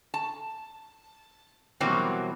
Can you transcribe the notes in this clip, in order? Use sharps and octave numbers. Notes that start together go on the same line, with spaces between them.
A5
B2 E3 F#3 G3 A#3 C4